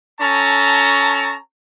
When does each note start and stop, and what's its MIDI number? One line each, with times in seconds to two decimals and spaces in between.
0.20 1.36 61
0.20 1.36 69
0.20 1.36 81
0.20 1.36 82
0.20 1.36 85